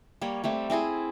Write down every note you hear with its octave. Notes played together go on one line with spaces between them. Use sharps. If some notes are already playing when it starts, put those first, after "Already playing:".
G3 A#3 C#5
G3 A3 C4
C4 E4 G#4 C5